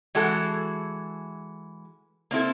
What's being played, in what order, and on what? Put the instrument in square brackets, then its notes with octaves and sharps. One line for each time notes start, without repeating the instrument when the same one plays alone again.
[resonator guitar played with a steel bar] E3 G#3 F#4 A4
A#3 C4 E4 A4